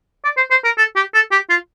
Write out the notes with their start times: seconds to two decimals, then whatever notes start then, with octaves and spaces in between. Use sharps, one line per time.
0.24 D5
0.37 C5
0.51 C5
0.64 A#4
0.78 A4
0.96 G4
1.14 A4
1.32 G4
1.50 F4